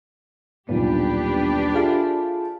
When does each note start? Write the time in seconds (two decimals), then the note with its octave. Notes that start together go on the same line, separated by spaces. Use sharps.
0.69 D#1 B1 A#2 B3 D4 G4 B4
1.74 F4 G#4 A4 E5 F5 A5